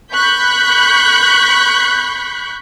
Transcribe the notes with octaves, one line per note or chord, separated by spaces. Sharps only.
B5 C#6 F#6 G6 B6